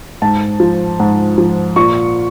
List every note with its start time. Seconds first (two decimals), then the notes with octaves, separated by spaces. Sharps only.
0.22 G#2 A5
0.60 F3
1.00 G#2
1.38 F3
1.76 A#2 C#6